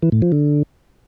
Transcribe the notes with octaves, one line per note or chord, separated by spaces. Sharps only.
E3
A2
F3
D3